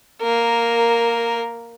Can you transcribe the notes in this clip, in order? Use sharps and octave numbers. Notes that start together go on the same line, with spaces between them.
A#3 A#4